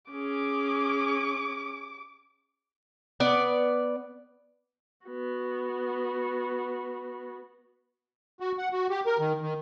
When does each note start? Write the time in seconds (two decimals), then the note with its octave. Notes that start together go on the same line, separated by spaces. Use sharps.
0.11 C#4 G#4 D6
3.20 B3 D5
5.06 B3 F#4
8.40 F#4
8.58 F#5
8.72 F#4
8.90 G4
9.06 A#4
9.19 D#3
9.41 D#3